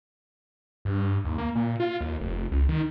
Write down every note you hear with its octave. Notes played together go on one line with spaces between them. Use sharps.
G2
D#2
A#3
A#2
F4
D#2
F1
C#2
D#3